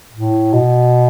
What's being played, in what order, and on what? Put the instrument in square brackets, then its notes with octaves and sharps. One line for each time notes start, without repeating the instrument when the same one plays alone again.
[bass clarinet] A2
B2